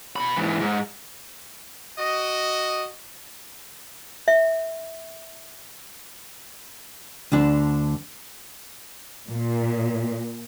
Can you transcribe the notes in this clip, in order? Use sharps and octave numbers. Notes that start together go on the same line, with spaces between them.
B2 B5
G#2 E3
G#2
F#4 D#5
E5
D2 D3 D4 A5
A#2